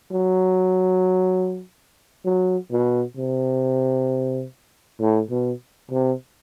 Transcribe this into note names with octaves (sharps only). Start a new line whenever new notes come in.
F#3
F#3
B2
C3
A2
B2
C3